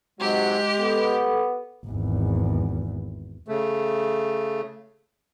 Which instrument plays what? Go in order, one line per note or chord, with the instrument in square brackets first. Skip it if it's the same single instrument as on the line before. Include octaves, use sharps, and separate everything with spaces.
[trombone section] G#2 C3 F#3 [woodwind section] G#3 [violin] G4
[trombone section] B3 [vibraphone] A4 D6
[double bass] G#1 E2
[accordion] C#3 A3